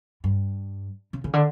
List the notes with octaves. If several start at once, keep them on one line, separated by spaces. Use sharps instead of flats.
G2
C#3
C#3
D3